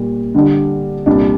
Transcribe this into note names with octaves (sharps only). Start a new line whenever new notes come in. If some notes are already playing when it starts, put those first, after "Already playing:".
Already playing: A#2 G3
D3 G3 D4
C2 A#2 G3 D4